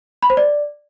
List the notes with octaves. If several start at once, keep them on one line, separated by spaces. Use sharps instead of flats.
B5
C5
D5